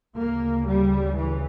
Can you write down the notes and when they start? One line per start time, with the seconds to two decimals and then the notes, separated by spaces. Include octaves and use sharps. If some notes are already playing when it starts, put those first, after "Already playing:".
0.18 D2 C#3 A#3
0.66 G3
1.15 E3